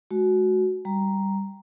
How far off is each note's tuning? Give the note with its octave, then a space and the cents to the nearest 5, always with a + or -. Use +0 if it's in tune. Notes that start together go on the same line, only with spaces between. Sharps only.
G#3 +35 F#4 +0
G3 +0 A#5 +0